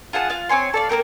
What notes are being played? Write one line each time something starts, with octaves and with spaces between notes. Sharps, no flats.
F4 G#4 F#5 A5
F4 F5
C4 C#5 G#5 C6
A4 D5 F5
A#3 C4 A#4 G5